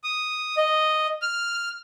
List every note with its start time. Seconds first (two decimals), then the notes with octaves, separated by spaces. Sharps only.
0.04 D#6
0.57 D#5
1.22 F6